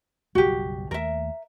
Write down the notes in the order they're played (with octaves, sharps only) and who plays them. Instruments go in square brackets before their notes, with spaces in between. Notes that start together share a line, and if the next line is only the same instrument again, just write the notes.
[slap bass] F#1 B1 G3 [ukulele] F#4 G4
[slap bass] D#2 A3 [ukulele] A#4 E5